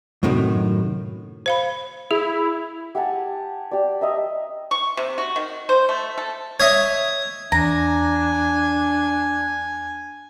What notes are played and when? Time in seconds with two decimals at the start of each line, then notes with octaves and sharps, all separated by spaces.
0.23 F#2 A2 C3 D#3 E3 F#3
1.46 C5 F5 B5
2.11 E4 G#4
2.95 G4 F#5 G#5 A5
3.71 G4 D5
4.01 D#5 E5 A#5
4.71 C#6
4.97 C3
5.18 F#4
5.36 D#3
5.69 C5
5.89 A3
6.18 A4
6.60 C#5 D#5 E5 G#6
7.52 E2 D4 G#5 A#5